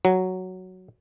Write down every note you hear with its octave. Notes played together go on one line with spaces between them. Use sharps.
F#3